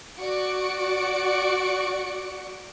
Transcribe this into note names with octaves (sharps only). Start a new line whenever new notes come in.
F#4 D5 C#7 D7